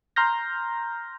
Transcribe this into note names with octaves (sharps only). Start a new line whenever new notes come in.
A#5 C6 F6 G6 A#6